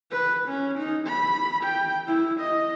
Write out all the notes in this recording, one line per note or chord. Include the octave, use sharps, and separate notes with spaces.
B4
C#4
D#4
B5
G5
E4
D#5